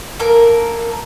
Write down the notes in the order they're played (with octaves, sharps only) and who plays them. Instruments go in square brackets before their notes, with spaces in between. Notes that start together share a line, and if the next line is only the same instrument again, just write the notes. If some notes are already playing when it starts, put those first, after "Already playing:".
[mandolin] A#3 A4 A#4